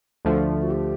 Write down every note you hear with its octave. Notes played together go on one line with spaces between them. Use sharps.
D2 D3 F3 A3
F4
F#4
G4